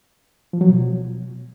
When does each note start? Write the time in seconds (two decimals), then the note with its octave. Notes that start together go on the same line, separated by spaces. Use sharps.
0.53 F3
0.61 F#3
0.68 B2